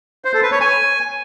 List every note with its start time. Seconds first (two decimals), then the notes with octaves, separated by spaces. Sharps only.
0.25 C5
0.34 A4
0.43 B4
0.52 C#5
0.61 G#5